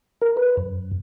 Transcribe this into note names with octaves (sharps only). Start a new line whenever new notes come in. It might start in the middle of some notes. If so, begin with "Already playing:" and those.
A#4
B4
F#2